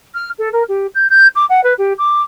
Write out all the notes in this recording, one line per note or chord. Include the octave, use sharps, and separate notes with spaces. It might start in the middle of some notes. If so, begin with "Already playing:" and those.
F6
A4
A#4
G4
G6
G6
D6
F#5
B4
G4
D6